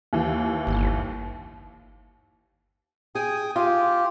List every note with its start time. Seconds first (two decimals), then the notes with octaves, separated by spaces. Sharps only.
0.13 D#2 E3
0.67 G1
3.15 G#4 G5 G#5 D#6
3.56 F4 G4